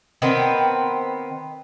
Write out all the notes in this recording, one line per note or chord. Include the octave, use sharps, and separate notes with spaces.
D#3 B3 C4